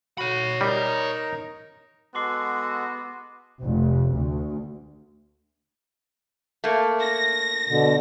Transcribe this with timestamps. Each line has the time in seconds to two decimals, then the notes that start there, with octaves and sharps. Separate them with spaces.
0.18 F#4 C#5 B5
0.61 G3 D#4 A#4
2.15 G#3 B3 F#4 A4 C6 D6 C7
3.62 F1
4.13 D2
6.64 A3 A#3
7.02 A#6
7.69 B2 D3